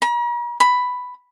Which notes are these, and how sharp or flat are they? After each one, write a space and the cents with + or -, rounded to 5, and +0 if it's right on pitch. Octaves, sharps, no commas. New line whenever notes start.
A#5 +45
B5 +5